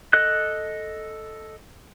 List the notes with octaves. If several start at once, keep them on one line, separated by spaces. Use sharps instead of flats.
A4 D#5 F#6